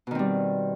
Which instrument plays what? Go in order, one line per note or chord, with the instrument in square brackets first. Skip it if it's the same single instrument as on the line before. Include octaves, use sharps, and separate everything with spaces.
[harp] B2
D#3
C4
G3